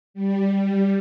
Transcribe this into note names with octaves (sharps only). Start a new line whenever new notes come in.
G3